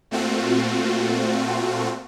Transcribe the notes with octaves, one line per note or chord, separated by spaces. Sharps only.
A#2 A3 C4 F4 F#4